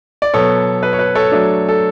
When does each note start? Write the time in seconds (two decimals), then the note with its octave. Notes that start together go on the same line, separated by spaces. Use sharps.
0.22 D5
0.34 B2 F#3 B3 A4 C#5
0.83 B4
0.93 C#5
0.99 B4
1.15 A4 C#5
1.32 F#3 A3 D4
1.69 A4